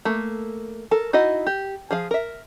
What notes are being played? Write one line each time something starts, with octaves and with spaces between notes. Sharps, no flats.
A3 A#3
A4 A#4
D#4 E4 F#4 D#5
G4
F3 G#4 F5
A#4 E5